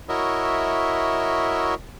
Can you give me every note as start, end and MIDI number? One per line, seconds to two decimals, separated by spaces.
0.09 1.74 64
0.09 1.74 66
0.09 1.74 70
0.09 1.74 73
0.09 1.74 75
0.09 1.74 76